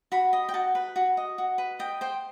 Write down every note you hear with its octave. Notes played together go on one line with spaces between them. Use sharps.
F#4 B5
D#5
G5
F#4 A5
B4
F#4
D#5
F#4
B4
D#5 G5
C5 G5